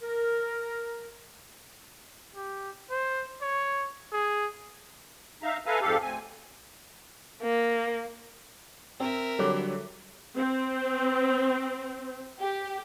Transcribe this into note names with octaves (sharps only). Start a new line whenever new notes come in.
A#4
G4
C5
C#5
G#4
D#4 E5 F5 A#5
A4 B4 E5 F5 G#5 A#5
F2 G#2 G4 A4 F5
D2 C4 G#5
A#3
C4 A#4 E5
D3 F#3 G3 A4 C#5 D6
C4
G4